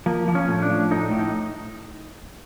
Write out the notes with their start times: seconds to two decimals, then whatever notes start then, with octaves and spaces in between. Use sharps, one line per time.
0.06 F3 A#3
0.28 F3
0.35 C#4
0.48 A2
0.62 D4
0.70 F3
0.91 A2 D#4
1.11 A2
1.19 D#4